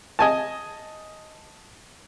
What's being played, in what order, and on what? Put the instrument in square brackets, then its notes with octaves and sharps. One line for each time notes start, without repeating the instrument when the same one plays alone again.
[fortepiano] D#5 G#5 A5